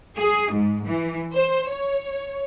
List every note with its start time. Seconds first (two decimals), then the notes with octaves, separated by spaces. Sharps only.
0.18 G#4
0.53 G#2
0.86 E3
1.34 C5
1.69 C#5